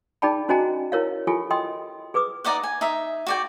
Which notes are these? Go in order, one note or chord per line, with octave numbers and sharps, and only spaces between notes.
D#4 G#4 D5 G5 A5 B5
C#4 F#4 C5 D#5 G#5 A#5
E4 A#4 C#5 F5
E4 F4 G4 A4 G#5
D#5 G5 C6 D#6
G#4 B4 D6 D#6
D#4 D5 D#5 F#5
G#5
D#4 E5
F#4 D5 G5